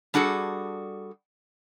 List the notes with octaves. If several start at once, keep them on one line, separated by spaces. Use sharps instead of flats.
G3 D4 F#4 G#4 A4